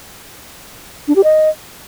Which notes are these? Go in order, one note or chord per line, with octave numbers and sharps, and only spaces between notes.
D4
G4
D#5